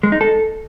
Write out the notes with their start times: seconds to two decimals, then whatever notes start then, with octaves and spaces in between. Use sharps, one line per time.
0.03 G#3
0.12 D#4
0.21 A4